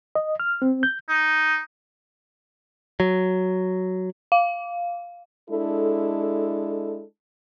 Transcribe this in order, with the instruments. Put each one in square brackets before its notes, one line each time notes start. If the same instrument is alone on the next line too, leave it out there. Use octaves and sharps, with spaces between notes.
[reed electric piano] D#5
F6
C4
G6
[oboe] D#4
[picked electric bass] F#3
[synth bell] F5
[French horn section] G#3 D4 E4 A4